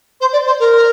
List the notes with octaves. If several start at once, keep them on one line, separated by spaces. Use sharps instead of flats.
C5
D5
C5
A#4